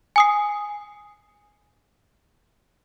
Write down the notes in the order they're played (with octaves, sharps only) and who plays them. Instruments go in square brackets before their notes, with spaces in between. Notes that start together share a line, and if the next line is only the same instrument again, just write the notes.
[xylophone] G#5 D#6 C7